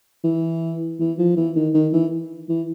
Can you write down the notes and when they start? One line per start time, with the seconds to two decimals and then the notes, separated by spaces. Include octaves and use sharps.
0.24 E3
1.00 E3
1.18 F3
1.37 E3
1.56 D#3
1.74 D#3
1.93 E3
2.49 E3